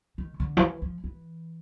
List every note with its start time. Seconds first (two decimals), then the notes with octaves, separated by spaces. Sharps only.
0.18 D#3
0.40 D3
0.57 F3
0.60 E3
0.82 F3
1.04 E3